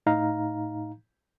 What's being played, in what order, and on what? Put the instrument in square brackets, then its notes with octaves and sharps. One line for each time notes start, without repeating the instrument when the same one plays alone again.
[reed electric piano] A2 D#4 F5 A#5